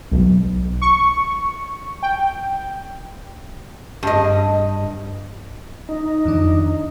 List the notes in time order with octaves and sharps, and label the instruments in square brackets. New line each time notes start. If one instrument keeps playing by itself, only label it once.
[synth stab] B1
C#6
G5
[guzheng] G2 D#5
[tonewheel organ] D#4
[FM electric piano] F2 D#3 D4